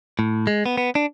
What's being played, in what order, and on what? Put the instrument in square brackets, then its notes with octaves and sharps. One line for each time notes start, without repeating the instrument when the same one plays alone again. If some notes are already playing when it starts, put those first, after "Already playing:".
[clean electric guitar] A2
G#3
B3
B3
D4